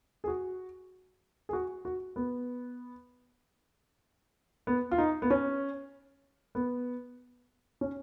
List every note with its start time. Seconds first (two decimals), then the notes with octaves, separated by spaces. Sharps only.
0.24 G#4
0.28 F#4
1.49 G#4
1.53 F#4
1.85 F#4
2.16 B3
4.67 B3
4.91 F4
4.98 D#4
5.22 B3
5.30 C#4
6.55 B3
7.81 C#4